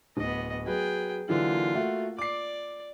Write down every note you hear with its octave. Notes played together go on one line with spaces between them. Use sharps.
D1 B3 D#5
F#3 G#4 B4 G5
D3 E3 F#3 A#3 F4
A3 F#4 F#5
D5 D6 C7